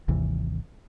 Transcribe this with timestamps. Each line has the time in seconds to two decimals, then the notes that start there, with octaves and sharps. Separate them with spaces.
0.08 G#1 D#2 C3 E3